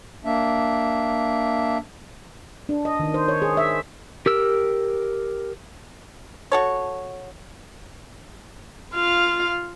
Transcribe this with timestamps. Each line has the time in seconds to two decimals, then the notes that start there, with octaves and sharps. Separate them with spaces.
0.25 A#3 D4 E5
2.69 D4
2.85 D#5
3.00 D#3
3.14 C5
3.28 C#5
3.42 G#4
3.57 E5
4.26 G4 A#4 E6
6.52 F#4 A4 C#5
8.95 F4 F5